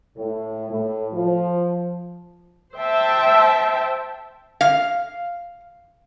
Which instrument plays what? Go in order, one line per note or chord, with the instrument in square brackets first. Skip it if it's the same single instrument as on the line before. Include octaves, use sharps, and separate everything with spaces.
[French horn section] A2
A2
F3
[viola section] C5 E5 G5 A5
[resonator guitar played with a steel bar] F5